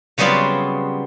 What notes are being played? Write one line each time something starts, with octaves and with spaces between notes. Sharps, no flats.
C#3 F#3 G3 B3 C4 F4